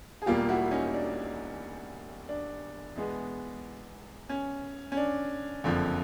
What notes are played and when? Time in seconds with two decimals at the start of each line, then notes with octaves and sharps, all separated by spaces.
0.22 G#4
0.26 E1 E2 B2 G3 A#3 F4 G4
0.49 E4 F#4
0.71 C#4 D#4
0.94 D4
2.29 D4
2.95 E2 B2 G#3 B3
4.29 C#4
4.92 C#4
4.97 D4
5.64 F#1 F2 D3 F3